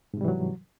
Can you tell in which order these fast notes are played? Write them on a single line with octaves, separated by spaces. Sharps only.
G#2 C3 G3 E3 F#3